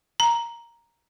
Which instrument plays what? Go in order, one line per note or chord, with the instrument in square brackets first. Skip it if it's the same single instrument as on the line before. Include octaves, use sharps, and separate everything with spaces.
[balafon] A#5